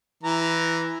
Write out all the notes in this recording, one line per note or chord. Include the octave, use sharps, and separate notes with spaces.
E3 A#5